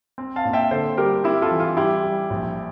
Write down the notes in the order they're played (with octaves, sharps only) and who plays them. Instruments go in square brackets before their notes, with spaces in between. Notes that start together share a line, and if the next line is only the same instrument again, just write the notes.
[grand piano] C4
F5 A5
A#2
E5 G5
D3 A4 C5
G3 G4 A#4
C4 E4 G4
F4 A4
E3
F4
G3 E4 G4
G3
A#1